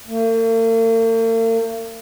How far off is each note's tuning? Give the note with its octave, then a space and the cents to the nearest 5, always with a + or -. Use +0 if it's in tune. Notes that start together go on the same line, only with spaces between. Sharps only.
A#3 -45